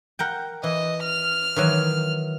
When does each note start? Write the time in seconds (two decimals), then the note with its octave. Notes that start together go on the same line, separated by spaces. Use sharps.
0.19 A#4 F#5 G5
0.63 E3 D#5
1.03 F6
1.56 D#3 E3 F#3